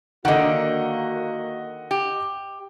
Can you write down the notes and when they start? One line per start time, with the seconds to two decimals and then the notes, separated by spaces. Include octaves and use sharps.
0.25 D3 D#3 A#3 F#4 D#5 F#5
1.91 G4